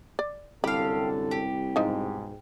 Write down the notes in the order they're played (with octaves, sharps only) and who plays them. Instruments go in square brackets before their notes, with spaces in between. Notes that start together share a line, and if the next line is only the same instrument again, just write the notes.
[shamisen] D5
[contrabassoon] C2 [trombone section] F#2 D3 A4 [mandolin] G4 F5 [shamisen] B5
[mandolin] G4
[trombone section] G#2 B2 [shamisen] F3 D#4